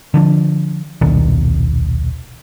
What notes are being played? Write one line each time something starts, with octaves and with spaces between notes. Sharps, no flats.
D3 F3 D4
D#1 B1 D#3 D4